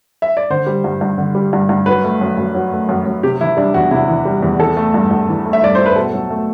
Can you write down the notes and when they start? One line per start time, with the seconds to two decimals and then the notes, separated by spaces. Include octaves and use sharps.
0.22 E5
0.37 D5
0.50 D3 C5
0.66 G3
0.84 G2
1.01 G2
1.18 D3
1.35 G3
1.53 G2
1.69 G2
1.86 F#3 B4
2.04 A3
2.21 F#2
2.37 F#2
2.55 F#3
2.72 A3
2.89 F#2
3.06 F#2
3.23 C3 G4
3.41 E3 E4
3.57 G3 D4
3.74 E2 F#4
3.91 C3 E4
4.08 E3
4.25 G3
4.42 E2
4.59 E3 A4
4.77 A3
4.94 G2
5.11 G2
5.29 E3
5.46 A3
5.53 E5
5.62 G2 D5
5.75 G2 C5
5.86 B4
5.96 B2 A4
6.14 F#3
6.30 A3